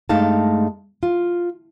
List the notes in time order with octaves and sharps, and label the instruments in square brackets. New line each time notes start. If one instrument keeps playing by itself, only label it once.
[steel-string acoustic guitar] G2 G#3 A3 D#4 F5 A5
F4